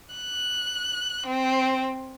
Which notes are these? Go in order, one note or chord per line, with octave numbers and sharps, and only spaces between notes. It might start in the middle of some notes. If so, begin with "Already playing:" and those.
F#6
C4